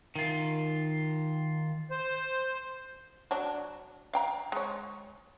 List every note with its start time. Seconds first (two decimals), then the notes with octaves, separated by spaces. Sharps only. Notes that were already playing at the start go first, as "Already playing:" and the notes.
0.16 D#3 F4
1.90 C5
3.31 F#3 D4
4.13 F5 G5 A#5
4.52 G#3 C#5